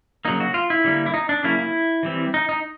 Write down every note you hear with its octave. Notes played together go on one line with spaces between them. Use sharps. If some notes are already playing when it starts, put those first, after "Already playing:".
C#3 F#3 A#3 D#4
F#4
F4
E4
D3 G3 A#3
E4
D#4
D4
C#3 F#3 A#3 C#4 E4
E4
E3 G3 C4
D#4
D#4